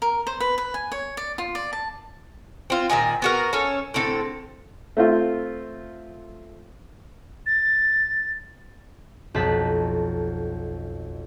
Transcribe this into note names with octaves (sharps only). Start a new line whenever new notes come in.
A#4
C5
B4
B4
G#5
C#5
D5
F4
D5
A5
C4 F4
A#2 D#3 D#5 G#5
B3 F#4 A#4
C#4 A4 C#5
A2 D3 C4 A4
A3 C4 F4
A6
B1 F2 F3 A5 F#6 B6